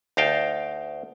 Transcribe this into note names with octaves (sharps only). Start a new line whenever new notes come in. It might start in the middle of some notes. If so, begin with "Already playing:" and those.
D2 D#4 F5 G5 A5